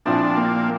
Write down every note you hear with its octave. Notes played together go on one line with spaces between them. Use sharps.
A#2 F3 C4 D4 E4
A#3